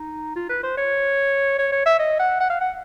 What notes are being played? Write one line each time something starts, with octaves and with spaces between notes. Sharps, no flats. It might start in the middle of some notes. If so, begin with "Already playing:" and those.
Already playing: D#4
F4
B4
C5
C#5
C#5
C#5
E5
D#5
F#5
F#5
F5
F#5